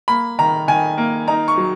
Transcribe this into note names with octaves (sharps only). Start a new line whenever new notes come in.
A#3 B5
D#3 A#5
D#3 G#5
A#3
D#4 A#5
C#6
F#3